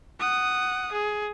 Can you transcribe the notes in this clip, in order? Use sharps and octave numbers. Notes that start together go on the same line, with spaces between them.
F#5 D#6
G#4